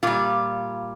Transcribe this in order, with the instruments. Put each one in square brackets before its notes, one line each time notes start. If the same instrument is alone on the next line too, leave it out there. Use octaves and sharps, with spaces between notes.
[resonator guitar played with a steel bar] A#2 G3 F4